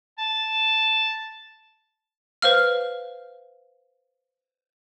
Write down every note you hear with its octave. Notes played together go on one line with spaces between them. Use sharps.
A5
B4 C5 F5 F6